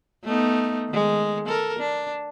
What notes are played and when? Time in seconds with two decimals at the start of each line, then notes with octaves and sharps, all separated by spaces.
0.24 A3 B3 D#4
0.89 D#3 G#3
1.47 A4 A#4
1.79 D4